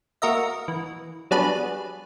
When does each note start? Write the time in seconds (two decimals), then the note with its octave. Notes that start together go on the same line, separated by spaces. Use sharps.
0.22 A#3 F#4 A#4 D#5 E5
0.68 E3
1.31 F#3 G3 B3 D4 G#4 B4